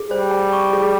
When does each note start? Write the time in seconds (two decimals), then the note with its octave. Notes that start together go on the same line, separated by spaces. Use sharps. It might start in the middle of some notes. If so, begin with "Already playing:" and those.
Already playing: G#4
0.11 G3 C5
0.31 G5
0.53 C#6
0.73 G#4